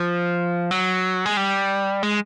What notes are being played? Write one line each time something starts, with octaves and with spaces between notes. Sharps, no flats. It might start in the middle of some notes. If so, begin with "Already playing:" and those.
Already playing: F3
F#3
G#3
G3
G#3